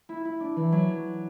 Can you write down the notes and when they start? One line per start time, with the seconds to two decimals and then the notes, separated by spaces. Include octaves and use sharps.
0.09 E4
0.25 E4
0.40 D4
0.56 E3
0.72 F#3